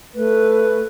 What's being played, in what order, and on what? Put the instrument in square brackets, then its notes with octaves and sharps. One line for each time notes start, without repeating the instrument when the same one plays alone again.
[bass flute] A3 [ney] B4